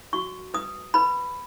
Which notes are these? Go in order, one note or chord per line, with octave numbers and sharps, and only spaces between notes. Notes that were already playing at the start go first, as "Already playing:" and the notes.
F#4 C#6
B4 D#6
B4 B5